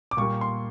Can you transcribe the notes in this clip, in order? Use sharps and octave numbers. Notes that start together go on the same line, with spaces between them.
D6
A#2 G3 A#3 C#6
C6